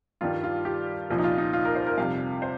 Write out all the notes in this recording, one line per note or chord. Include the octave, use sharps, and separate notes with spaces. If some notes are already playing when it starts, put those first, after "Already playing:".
G2 D#3 G3 F4
F4
G4
C2 A#2 F3
D#4
F4
D#4
F4
A#4
C5
A#4
F2 C3 G3 F5
C5